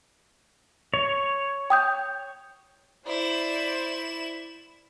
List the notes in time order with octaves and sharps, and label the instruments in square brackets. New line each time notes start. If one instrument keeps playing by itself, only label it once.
[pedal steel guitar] C#5
[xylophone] G5 D#6 G6
[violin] E4 E7 [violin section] C5 D5